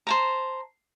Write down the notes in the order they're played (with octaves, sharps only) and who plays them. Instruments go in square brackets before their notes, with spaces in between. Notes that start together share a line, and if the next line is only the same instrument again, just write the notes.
[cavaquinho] C5 A5 A#5